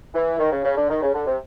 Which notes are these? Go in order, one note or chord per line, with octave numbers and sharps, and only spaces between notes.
E3
D#3
C#3
C#3
D3
D#3
C#3
D3
C3